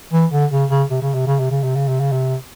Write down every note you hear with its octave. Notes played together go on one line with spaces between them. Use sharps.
E3
D3
C#3
C#3
C3
C#3
C3
C#3
C3
C#3
C3
C#3
C3
C#3
C3